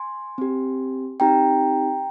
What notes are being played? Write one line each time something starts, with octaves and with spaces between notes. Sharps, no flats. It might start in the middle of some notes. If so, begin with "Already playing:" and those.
Already playing: G#5 C6
C4 G4
C4 D#4 G4 G5 A#5